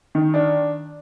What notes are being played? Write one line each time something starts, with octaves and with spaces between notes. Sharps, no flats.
D#3
D4